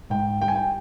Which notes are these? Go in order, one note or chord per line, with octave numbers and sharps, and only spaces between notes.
G#2 G5
G3 G5
G#5
G5